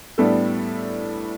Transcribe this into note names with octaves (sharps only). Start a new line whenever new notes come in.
A2 G3 B3 D4 A4